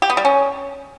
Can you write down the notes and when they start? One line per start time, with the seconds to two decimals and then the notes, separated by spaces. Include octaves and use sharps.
0.02 G4
0.10 B3
0.17 G3
0.25 C#4